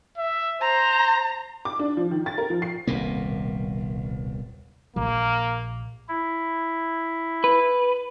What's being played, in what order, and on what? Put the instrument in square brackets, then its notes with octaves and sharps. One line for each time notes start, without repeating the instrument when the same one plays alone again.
[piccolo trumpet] E5
[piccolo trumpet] C5 [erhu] A#5
[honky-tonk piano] D6
D4
F3
D#3
A6
A#4
F3
C7
[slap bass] D#1 C2 B2 A#3
[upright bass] A#1 [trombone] A#3
[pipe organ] E4
[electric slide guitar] B4